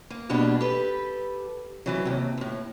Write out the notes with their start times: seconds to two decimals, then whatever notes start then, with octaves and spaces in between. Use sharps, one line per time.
0.10 A#3
0.29 E2 B2 G3 A#3 D4
0.61 G4 A4 B4
1.86 D2 E3 F#3
2.05 D#2 C3
2.38 D#2 A2